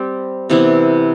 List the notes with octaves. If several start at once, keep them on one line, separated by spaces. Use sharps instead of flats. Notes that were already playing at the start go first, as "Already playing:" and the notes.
Already playing: G3 C4 G4
C3 E3 B3 E4